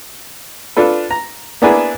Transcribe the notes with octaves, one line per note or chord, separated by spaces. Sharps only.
D4 F4 A4 B4
A#5
A#3 B3 D4 E4 G#4 B4